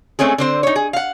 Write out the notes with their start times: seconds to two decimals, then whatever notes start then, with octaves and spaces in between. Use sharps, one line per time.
0.19 G#3 A3 C4 C#4 G#4
0.38 D3 C4 C5
0.63 D#4 C#5
0.76 G#4
0.93 F5 F#5